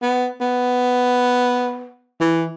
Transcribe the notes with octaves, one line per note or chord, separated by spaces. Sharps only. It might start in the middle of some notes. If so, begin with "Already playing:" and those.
B3
B3
E3